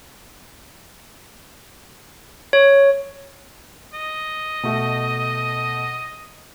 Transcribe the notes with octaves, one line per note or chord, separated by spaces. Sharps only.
C#5
D#5
B2 A3